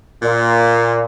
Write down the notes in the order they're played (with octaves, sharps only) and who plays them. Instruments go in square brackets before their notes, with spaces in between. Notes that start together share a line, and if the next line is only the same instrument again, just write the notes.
[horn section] A#2